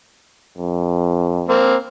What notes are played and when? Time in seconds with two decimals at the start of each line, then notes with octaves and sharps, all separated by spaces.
0.58 F2
1.49 A#3 C4